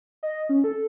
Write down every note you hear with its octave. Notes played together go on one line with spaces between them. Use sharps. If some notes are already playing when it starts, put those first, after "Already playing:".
D#5
C#4
A4